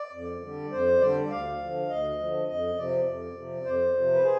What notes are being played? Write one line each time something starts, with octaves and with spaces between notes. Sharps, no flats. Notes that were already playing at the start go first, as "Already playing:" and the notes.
Already playing: D5
F2
D3 G3
F2 C5
D3 G3 D5
D2 F5
D3 F3
D2 D#5
D3 F3
F2 D#5
C3 F3 D5
F2
C3 F3
F2 C5
C3 F3
B4
G#4